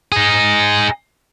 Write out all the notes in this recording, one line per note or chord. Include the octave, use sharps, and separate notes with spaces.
D#4 G#4